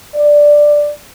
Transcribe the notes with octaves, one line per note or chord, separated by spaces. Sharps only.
D5